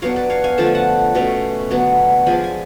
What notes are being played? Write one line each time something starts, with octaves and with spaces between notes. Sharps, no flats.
F#3 B3 D4 C#5 F5
B4 D5
C#5 F5
F5 G#5
D3 F3 A3 D4 A5
G#5
F#5 A5
B2 A3 C#4
D3 F#3 B3 D4
F3 G#3 D4 G#5 B5
G#5